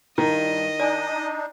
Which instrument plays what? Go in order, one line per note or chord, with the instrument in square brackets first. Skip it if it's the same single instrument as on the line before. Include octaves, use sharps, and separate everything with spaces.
[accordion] G2 [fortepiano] D#3 [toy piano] E4 [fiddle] D#5
[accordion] D4 D#4 [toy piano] D5 G#5